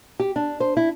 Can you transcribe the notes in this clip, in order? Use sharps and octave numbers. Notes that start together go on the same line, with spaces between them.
G4
D4
C5
E4